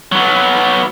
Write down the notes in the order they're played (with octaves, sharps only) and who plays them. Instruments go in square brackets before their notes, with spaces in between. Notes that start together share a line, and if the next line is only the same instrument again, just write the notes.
[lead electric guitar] F#3 B3